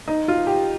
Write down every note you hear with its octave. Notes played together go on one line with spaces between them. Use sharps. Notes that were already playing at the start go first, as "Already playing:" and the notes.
D#4
F4
G4